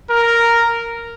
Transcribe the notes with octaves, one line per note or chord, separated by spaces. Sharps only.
A#4